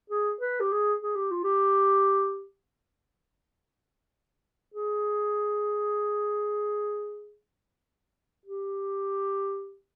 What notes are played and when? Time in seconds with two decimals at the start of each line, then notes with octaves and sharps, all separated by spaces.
0.10 G#4
0.41 B4
0.60 G4
0.72 G#4
1.02 G#4
1.16 G4
1.31 F4
1.44 G4
4.74 G#4
8.46 G4